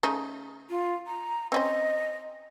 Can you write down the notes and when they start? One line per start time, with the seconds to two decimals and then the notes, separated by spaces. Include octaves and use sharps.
0.03 C#3 A3 D#4
0.70 F4
1.07 A#5
1.52 C4 C#4 C5 D#5